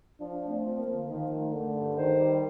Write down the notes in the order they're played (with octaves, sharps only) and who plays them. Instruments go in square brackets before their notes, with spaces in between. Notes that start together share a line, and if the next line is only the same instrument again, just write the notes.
[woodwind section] F3 [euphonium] D4
[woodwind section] A3
[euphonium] C4
[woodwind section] F3
[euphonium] A#3
[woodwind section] D3
[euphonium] D#3 [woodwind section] F3
[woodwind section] A3
[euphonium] D3 [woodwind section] A3
[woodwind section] G2
[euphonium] D#3 [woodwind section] C5
[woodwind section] G3